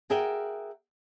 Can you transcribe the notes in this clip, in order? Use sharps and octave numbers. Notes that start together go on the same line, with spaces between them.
F#4 G#4 A#4 E5 F#5 G5